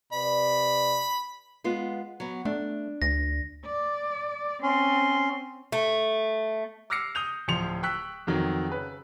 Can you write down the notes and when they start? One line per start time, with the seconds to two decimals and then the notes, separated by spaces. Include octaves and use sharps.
0.13 C3 B4 D5 B5
1.64 G#3 B3 F4
2.20 F#3 B3
2.45 A3 D4
3.02 D2 A#6
3.65 D5
4.63 C4 C#4 C6
5.72 A3
6.90 D6 E6 F6 A#6 C7 C#7
7.15 D#6 G6 F7
7.48 D1 F3 C6 C#7 F7
7.83 G5 C#6 E6 F#6 B6
8.27 F2 D#3 F#3
8.69 C#3 B4